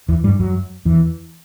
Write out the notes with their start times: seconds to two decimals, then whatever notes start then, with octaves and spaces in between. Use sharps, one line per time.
0.08 E2 E3
0.24 G2 G3
0.39 F#2 F#3
0.85 E2 E3